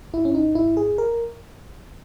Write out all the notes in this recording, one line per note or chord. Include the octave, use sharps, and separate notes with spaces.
G#1 E4
C#4
D#4
G#1 E4
G#4
A#4